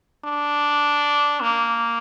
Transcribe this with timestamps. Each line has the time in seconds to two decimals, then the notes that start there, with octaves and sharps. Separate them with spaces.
0.26 D4
1.41 A#3